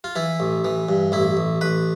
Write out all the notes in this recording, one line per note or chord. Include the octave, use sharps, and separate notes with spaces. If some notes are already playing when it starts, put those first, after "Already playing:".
F4
E3 E4
A1
E3
G2
A1 E4
A1
A1 B4